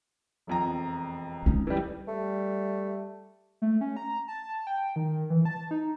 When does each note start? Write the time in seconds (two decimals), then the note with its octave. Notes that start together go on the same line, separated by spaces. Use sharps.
0.47 E1 F2 A#5
1.46 C#4 D#4
1.67 E3 G3
2.08 G3 A3
3.62 A3
3.81 C#4
3.97 A#5
4.28 A5
4.67 G5
4.96 D#3
5.30 E3
5.45 A5
5.71 D#4